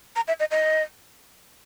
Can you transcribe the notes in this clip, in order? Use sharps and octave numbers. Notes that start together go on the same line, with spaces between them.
A#5
E5
D#5
D#5